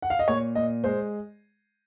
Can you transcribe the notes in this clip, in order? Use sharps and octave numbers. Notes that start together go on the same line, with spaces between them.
F#5
F5
D#5
A#2 C#5
A#2 D#5
G#3 C5